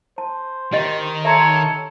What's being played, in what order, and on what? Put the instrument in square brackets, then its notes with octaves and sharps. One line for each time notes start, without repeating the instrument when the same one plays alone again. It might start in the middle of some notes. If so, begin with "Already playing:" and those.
[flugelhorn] C5 [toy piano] A5
[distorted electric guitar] D#3 [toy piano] G4 D#5
[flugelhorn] A4 [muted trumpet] C#5 [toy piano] E5 A#5 C6